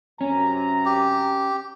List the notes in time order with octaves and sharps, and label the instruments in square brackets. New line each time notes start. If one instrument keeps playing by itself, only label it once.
[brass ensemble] F#2 C3 A#5 [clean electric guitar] C#4
[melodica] G4